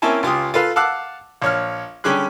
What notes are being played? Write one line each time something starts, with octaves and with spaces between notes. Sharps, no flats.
A#3 C4 C#4 E4 G#5 A5
C#2 F4 G4 D#6
F4 A4 B4 F5
F5 F#5 A5 D6 E6 F#6
A#1 C#5 F6
D3 G3 C#4 G#4 D6 F#6